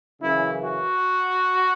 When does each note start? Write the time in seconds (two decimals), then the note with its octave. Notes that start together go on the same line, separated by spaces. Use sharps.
0.21 F#2 C#3 E3 E4
0.63 F#4